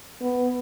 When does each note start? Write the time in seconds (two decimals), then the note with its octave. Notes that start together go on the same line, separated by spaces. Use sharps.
0.21 B3